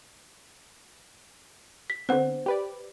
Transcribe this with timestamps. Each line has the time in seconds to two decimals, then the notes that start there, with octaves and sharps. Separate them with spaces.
1.90 B6
2.09 D3 B3 C4 C5 F#5
2.46 G4 B4 D5